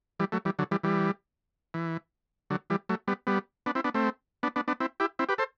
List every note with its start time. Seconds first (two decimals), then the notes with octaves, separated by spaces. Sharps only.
0.20 E3 G3
0.32 F#3 A3
0.45 E3 G3
0.59 D3 F#3
0.71 E3 G3
0.84 E3 G3
1.74 E3
2.50 D3 F#3
2.70 E3 G3
2.89 F#3 A3
3.08 G3 B3
3.27 G3 B3
3.66 B3 D4
3.75 C4 E4
3.84 B3 D4
3.94 A3 C4
4.43 B3 D4
4.56 B3 D4
4.68 B3 D4
4.80 C4 E4
5.00 E4 G4
5.19 C4 E4
5.29 G4 B4
5.38 A4 C5